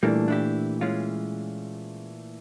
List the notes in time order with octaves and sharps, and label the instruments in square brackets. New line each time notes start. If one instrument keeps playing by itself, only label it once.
[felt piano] A#2 E3 A3 [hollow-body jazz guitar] G3 A#3 D4
[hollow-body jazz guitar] D4 E4 G4
G#3 C#4 F4